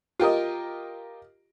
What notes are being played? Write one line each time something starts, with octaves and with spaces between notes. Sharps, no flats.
F4 G4 A#4 D#5